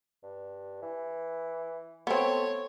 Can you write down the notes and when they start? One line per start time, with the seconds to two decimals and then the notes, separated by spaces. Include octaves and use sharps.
0.23 G2
0.82 E3
2.07 A3 B3 C4 C#5